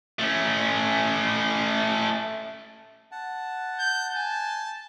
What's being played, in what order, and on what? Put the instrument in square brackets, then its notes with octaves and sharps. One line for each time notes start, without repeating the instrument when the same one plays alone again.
[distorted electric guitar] A3 C#4
[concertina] F#5 A5
[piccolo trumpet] G6
[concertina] G#5 [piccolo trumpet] A5